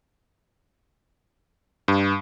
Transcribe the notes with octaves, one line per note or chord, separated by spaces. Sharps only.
G2